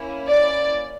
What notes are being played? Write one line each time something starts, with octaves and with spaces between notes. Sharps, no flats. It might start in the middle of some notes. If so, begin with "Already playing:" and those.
Already playing: A#3 C#4 E4
D5